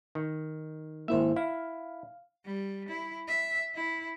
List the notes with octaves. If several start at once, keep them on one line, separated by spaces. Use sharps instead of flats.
D#3
G#1 A#3 E4 C5 E5
E4 F5
G3
E4
E5
E4